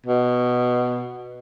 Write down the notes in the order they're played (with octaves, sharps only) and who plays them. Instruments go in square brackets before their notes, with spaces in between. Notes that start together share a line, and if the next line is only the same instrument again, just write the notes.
[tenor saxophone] B2